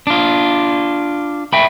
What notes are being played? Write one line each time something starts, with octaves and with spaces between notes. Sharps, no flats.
D4 F4
E5 G5 B5